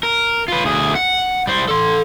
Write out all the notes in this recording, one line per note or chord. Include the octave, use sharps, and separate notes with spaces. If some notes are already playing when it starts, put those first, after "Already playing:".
A#4
F4 B4
D2 G#4
F#5
G3 C5
A4 C6